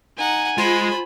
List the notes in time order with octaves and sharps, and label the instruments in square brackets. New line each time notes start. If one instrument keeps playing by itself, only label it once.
[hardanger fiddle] D#4 F#5 [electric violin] G#5
[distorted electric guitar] G#3 [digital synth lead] F4 [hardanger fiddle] C5 B5